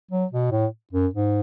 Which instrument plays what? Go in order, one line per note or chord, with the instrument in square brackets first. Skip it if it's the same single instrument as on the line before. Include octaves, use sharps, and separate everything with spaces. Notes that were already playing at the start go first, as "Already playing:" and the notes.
[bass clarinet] F#3
B2
A2
F#2
G#2